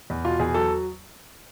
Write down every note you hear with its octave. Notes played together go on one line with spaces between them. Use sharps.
E2
B2 F4
E2 G#4
F#3 A4